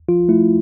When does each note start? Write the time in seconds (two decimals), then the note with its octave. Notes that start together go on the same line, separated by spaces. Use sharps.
0.08 F3 F4
0.29 A3 E4